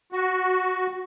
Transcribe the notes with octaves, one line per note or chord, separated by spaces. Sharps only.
F#4